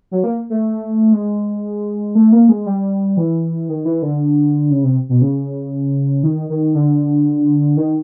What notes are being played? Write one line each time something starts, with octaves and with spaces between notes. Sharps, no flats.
F#3
A#3
A3
G#3
A3
A#3
G#3
G3
E3
D#3
E3
D3
C#3
C3
B2
C#3
D#3
D#3
D3
D#3